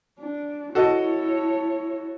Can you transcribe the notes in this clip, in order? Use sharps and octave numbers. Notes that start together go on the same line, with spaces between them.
D4
E4 F#4 A4 C#5 D#5